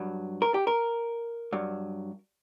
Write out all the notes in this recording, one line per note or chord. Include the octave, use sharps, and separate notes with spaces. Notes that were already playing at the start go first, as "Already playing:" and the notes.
Already playing: G2 F#3
A#4
G4
A#4
G2 F#3